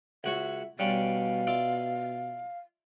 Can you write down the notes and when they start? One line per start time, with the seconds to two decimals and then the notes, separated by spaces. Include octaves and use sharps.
0.24 C#2 F#4 C#5 E5
0.79 B2 G3 C#4 D4 F5
1.47 F4 D5 E5